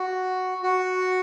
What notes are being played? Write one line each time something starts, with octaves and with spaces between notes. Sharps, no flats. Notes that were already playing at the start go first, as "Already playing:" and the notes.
Already playing: F#4
F#4